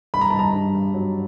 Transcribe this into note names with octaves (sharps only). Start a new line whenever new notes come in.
G2 B5
A#5
G2 A5
A#5
G2
G2
F#3